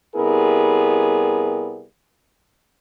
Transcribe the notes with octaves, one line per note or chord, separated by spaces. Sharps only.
C3 G3 B3 E4 G#4 A#4